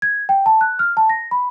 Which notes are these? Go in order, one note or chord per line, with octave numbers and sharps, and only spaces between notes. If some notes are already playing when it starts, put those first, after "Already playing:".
G#6
G5
A5
F#6
F6
A5
A#6
B5